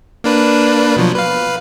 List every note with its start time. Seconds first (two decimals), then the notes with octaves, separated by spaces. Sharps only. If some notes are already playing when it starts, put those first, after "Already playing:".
0.24 A#3 D4 B4
0.96 B2 F3 F#3
1.15 B4 F5